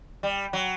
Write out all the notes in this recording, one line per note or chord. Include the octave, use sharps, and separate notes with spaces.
G3
F#3